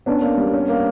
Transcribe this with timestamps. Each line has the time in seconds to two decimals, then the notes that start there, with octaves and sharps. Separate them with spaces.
0.06 B3 C#4 D4
0.22 A#3
0.37 G3
0.53 C#4
0.69 A#3